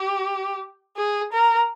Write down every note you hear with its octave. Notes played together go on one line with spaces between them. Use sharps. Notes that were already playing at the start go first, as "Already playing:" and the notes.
Already playing: G4
G#4
A#4